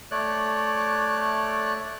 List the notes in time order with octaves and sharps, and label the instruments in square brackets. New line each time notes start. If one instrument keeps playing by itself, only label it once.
[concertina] A3 C#5 D5 F#6